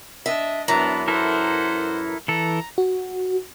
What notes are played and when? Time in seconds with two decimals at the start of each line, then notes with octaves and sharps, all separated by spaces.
0.26 D4 D#5 E5
0.68 F#2 E3 B3 D4 A#5
1.08 E4 A4 A#4 C5 F#5
2.28 E3 A4 A#5
2.78 F#4